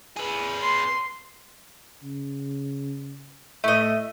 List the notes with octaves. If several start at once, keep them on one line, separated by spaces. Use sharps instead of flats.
G#4 B4
C6
C#3
A2 A3 D#5 E5